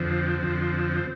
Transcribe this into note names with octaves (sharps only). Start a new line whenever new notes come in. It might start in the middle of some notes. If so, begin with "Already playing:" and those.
Already playing: F2 D3 F3 C4
F2 D3 F3